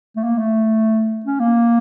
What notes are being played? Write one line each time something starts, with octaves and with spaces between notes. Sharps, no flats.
A3
A#3
A3
C#4
A#3